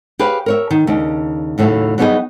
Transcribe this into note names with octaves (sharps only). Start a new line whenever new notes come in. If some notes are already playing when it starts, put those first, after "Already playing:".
G4 G#4 B4 C#5 F5
A#4 C#5 E5
D#3
D#2 C#3 D4 D#5
D#2 A2 C#3 F#3 E5
F#3 G3 B3 D#4 G#4 D#5